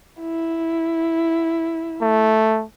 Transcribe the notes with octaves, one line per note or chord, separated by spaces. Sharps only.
E4
A3